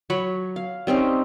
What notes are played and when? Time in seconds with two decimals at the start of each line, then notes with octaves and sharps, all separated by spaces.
0.10 F#3 C#5 B5
0.56 F5
0.87 G3 C4 C#4 D#4